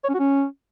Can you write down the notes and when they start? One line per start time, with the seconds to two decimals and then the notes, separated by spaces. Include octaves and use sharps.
0.05 C#5
0.10 C#4
0.15 F#4
0.20 C#4